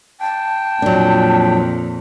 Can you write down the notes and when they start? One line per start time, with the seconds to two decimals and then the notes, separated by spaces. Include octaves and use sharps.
0.21 G5 A5
0.82 F2 A#2 F#3 D4